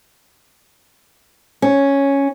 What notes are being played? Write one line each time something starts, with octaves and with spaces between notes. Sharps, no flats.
C#4